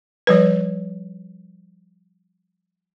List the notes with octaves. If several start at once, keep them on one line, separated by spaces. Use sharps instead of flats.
F3 G3 B4